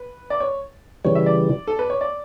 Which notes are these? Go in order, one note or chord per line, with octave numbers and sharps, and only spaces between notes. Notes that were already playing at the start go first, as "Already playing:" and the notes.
Already playing: B4
D5
C#5
C#3 E3 G3 C#5
E5
D5
A4
B4
C#5
D5